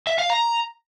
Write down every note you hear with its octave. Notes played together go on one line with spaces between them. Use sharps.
E5
F5
A#5